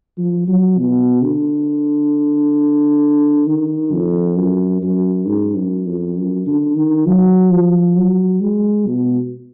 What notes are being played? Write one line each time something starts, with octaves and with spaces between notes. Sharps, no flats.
F3
F#3
B2
D3
D#3
F2
F#2
F#2
G#2
F#2
F2
F#2
D3
D#3
F#3
F3
F#3
G#3
B2